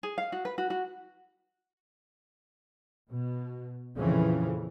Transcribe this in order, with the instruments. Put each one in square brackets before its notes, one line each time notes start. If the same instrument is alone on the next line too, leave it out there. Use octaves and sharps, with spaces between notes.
[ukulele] G#4
F5
F#4
B4
F#4
F#4
[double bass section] B2
F2 A#2 C#3 E3 F3